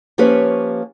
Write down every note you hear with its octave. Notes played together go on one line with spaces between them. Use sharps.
F3 A#3 C#4 G4 B4 C#5